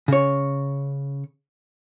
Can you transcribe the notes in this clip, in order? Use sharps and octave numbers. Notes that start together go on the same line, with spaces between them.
C#3 C#5